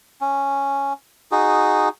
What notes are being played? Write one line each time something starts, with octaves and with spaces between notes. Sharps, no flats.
C#4
D#4 F#4 G#4